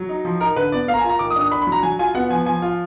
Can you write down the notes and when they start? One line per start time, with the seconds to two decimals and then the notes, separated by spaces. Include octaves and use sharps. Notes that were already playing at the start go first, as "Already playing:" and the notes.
Already playing: F#3
0.09 D#4
0.25 F3
0.41 D#4 A#4
0.56 D3 B4
0.72 B3 D5
0.88 A#3 F5
0.94 A#5
0.99 G#5
1.04 F4
1.09 A#5
1.19 D#3 D6
1.30 D#6
1.36 D4
1.41 D#6
1.52 D4 B5
1.62 B5
1.67 F#3 A#5
1.83 F#3 G#5
1.99 F4 G#5
2.15 B3 F#5
2.30 F3 G#5
2.46 F3 G#5
2.62 F4